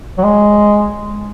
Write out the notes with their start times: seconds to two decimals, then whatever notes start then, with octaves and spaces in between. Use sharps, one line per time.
0.18 F#3
0.24 G#3